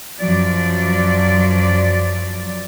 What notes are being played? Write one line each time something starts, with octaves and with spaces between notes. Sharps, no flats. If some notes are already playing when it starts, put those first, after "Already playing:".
F#2 F3 F#3 D5